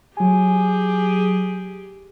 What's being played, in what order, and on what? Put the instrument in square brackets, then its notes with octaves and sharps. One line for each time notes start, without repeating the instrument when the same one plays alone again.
[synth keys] F#3 G#5 [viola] G4 G#4